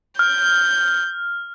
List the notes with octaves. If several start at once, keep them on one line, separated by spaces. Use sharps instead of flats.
F6 G6